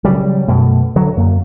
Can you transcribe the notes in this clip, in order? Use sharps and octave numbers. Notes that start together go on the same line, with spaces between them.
C#3 F#3 G3
F#2 B2 A3
D3 F#3
F#2 A#3